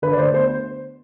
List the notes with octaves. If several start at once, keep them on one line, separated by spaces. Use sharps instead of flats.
D3 B4
D5
D2 C5
B3 C5